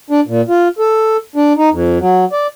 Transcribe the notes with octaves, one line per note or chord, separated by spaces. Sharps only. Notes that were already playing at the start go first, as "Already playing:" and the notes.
D4
A#2
F4
A4
D4
D#4
F2
F#3
D5